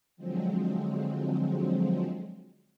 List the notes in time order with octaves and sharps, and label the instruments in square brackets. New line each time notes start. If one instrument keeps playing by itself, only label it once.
[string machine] D3 F3 F#3 G#3 C4